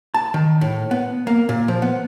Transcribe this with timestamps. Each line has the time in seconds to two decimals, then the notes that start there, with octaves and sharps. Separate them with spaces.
0.14 A5
0.34 D#3
0.61 A2
0.91 B3
1.27 A#3
1.49 A#2
1.68 F3
1.82 B3